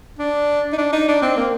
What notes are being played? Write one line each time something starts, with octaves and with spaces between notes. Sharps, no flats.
D4
D#4
D4
D#4
D4
C4
A#3